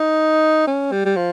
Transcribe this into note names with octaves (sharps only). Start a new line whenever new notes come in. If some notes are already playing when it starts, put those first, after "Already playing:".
Already playing: D#4
C#4
G3
G3
F3